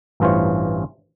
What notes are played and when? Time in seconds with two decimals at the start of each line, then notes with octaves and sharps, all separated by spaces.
0.20 A1 G2 E3 F4 C5 C#5